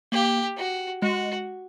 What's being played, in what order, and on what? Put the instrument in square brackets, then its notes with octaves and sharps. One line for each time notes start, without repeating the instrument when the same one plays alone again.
[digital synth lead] A#3 [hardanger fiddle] G4
[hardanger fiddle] F#4
[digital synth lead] G#3 [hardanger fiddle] F#4